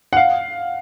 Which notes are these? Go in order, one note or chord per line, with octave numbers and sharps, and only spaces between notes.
F#5
F5